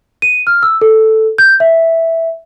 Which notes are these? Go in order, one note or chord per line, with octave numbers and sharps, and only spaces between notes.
D#7
F6
E6
A4
G6
E5